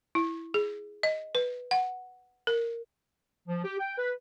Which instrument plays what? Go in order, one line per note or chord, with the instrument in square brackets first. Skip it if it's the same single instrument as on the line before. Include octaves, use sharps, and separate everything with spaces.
[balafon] E4
G#4
D#5
B4
F#5
A#4
[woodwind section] F3
G4
G5
B4